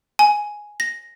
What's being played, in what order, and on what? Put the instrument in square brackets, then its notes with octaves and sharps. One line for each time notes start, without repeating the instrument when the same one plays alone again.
[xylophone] G#5
A#6